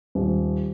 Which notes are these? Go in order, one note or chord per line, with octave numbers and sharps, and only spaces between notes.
D#1